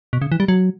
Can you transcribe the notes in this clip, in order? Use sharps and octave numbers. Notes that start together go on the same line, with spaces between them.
B2
C#3
E3
G3
F#3